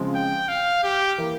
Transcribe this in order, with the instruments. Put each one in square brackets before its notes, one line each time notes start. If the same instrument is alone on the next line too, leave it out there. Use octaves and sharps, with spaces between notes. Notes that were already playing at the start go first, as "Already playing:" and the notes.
Already playing: [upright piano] C#3 F3 G#3 C4
[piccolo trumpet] G5
F5
G4
[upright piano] E3 A#3